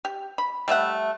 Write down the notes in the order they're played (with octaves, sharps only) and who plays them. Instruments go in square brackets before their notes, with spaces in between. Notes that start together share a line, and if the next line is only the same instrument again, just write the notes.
[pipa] G4
B5
G3 A3 E5 F#5